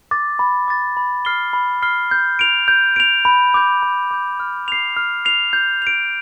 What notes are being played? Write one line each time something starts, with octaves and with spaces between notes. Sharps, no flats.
D6 A6
B5
D6 A6
B5
F6 C7 G7
B5
F6 C7 G7
G6
D7 F7
G6
D7 F7
B5
D6 G6
B5
D6 G6
F6
C7 F7
F6
C7 F7
G6
D7 F7